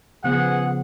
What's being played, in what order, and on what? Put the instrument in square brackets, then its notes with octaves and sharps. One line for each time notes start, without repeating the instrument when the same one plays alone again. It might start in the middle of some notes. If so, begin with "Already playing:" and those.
[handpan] C#3 F3 B3 [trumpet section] G#4 F#5